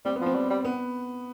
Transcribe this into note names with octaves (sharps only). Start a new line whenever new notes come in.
G3 C4
B3
F3 C4
G3
G3
B3